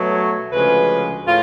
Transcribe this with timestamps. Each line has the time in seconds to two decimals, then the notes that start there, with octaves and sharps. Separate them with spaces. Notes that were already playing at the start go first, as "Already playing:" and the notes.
Already playing: B2 F#3 A3
0.13 C#5
0.51 D2 C#3 F3 G#3 B4
1.27 A2 F4